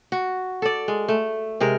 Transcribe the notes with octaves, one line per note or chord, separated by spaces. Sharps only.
F#4
A4 D5
G#3
A3
C3 G#3 A#4